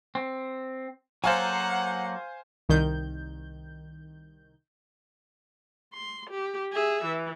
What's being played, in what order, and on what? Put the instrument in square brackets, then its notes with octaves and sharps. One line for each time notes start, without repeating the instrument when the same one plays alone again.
[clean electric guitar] C4
[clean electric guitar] F#3 A#3 A4 [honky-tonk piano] C5 F5 G#5 [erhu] F#5
[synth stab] C2 D#3 G6
[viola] C6
G4
G#4 E5
E3